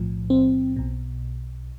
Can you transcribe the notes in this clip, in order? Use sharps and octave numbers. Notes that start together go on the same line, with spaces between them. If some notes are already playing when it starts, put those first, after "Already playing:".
Already playing: B1 A2 F3
C4
B1 B2